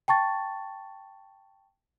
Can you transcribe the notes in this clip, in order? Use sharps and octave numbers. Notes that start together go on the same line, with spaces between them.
G5 A5 C#6 A6